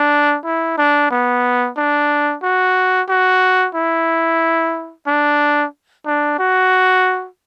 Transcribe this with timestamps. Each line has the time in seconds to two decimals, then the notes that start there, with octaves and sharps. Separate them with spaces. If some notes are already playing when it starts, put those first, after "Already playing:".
Already playing: D4
0.45 E4
0.78 D4
1.11 B3
1.77 D4
2.43 F#4
3.08 F#4
3.75 E4
5.07 D4
6.06 D4
6.39 F#4